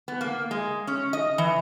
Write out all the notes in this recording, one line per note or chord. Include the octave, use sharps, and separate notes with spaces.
B3
A#3
G#3
C#4
D#5
E3